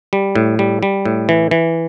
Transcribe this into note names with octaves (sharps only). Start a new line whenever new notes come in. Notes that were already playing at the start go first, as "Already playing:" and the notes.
G3
A2
G3
G3
A2
E3
E3